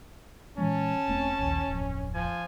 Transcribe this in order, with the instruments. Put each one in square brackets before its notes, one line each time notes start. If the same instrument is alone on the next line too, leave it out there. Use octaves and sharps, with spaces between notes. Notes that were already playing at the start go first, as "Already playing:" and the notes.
[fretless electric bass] A#2 E3 G#3 [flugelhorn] C#4 [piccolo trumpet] A5
[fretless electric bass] E1 A3 C4
A#1 D#2
D1 F2
[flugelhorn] F3 [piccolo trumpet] G#5